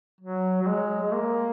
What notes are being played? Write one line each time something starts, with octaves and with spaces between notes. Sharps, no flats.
F#3
F#3
G#3
G#3
A#3